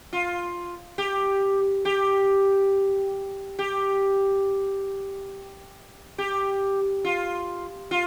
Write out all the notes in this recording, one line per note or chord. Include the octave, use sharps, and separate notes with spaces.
F4
G4
G4
G4
G4
F4
F4